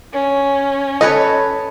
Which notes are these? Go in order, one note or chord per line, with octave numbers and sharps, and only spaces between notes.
C#4
A4 B4 C#5 D#5